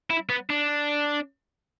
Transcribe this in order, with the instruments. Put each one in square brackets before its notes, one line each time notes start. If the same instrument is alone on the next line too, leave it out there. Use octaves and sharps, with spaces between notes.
[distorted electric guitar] E4
B3
D4